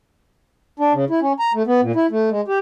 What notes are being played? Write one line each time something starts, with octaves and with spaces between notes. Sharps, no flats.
D4
C#3
E4
C#4
A#5
A3
B3
A#2
E4
A3
G#3
G4